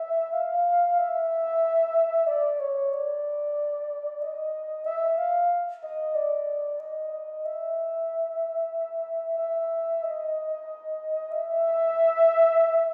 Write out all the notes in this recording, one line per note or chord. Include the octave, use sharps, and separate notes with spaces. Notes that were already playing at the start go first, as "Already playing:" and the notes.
Already playing: E5
F5
E5
D5
C#5
D5
D#5
E5
F5
D#5
D5
D#5
D#5
E5
E5
D#5
E5